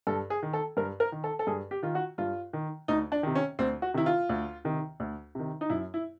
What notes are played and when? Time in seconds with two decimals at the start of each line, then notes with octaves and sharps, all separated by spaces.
0.07 G2 A4
0.30 G#4
0.43 D#3
0.53 A4
0.77 G2 A#4
1.00 A#4
1.12 D#3
1.24 A4
1.39 A4
1.47 G2 G#4
1.71 G4
1.83 D#3 F4
1.95 F#4
2.18 G2 F4
2.53 D#3
2.88 D2 D#4
3.12 D4
3.23 C3 D#3
3.35 C#4
3.59 D2 C4
3.82 F#4
3.94 C3 D#3 E4
4.06 F4
4.29 D2
4.65 C3 D#3
5.00 D2
5.35 C3 D#3
5.61 D#4
5.70 F#2 E4
5.94 E4